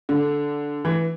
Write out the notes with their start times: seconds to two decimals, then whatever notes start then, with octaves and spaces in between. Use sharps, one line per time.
0.09 D3
0.85 E3